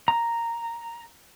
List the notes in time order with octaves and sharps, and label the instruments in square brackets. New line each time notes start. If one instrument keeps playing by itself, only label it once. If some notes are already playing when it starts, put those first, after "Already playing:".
[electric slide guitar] A#5